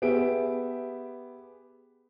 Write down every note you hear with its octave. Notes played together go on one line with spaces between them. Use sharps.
B3 G4 G#4 E5 D7